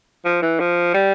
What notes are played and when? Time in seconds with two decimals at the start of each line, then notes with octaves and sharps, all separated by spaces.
0.25 F3
0.42 E3
0.60 F3
0.94 G3